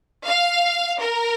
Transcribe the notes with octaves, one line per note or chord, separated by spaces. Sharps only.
F5
A#4